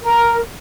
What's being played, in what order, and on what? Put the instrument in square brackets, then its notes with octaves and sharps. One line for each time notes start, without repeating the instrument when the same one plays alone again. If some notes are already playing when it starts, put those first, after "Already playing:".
[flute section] A#4